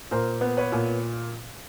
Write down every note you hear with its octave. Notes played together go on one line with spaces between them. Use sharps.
A#2 A#4 C5
B3
B4 C#5
A#2